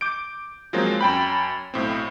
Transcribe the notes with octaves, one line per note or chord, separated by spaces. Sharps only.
D6 G6 D7
F3 F#3 G#3 A#3 C4 F4
F#2 G5 B5
B1 A2 C4